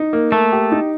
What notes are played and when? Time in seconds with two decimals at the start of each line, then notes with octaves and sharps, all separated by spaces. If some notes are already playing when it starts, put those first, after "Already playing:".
Already playing: D#4
0.13 A#3
0.32 A3 A#3
0.52 G4
0.72 D#4